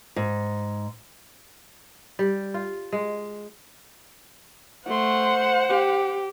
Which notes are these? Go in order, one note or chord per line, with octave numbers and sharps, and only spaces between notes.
G#2
G3
F4
G#3
A3 C5 F#5 C6
G4